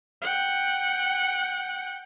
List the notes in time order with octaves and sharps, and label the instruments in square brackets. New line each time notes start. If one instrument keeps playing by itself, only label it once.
[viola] F#5 G5